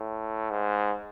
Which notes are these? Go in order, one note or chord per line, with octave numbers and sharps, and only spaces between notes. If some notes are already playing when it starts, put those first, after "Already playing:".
Already playing: A2
G#2